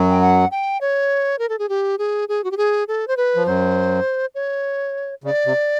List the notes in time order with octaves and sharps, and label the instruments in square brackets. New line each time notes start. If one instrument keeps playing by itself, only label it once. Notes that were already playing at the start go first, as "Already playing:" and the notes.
Already playing: [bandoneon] F#2 F#3
[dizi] G5
F#5
G5
C#5
A#4
A4
G#4
G4
G#4
G#4
F#4
G4
G#4
A4
C5
B4
[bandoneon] F3
[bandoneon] F#2 F#3 [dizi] C5
[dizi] C#5
[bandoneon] C#3 [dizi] D5
[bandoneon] C3